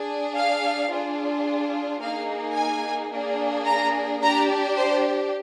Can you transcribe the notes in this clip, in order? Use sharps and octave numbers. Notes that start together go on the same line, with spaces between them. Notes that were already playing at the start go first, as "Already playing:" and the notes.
Already playing: D4 G#4
F5
D4 F4 G#4
A#3 D#4 G#4 F5
G#5
A#3 D4 G#4
A#5
D4 G4 A#5
C5